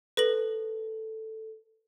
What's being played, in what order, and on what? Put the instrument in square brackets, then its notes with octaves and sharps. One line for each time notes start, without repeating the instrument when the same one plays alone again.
[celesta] A4 [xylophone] B4 A#6 F#7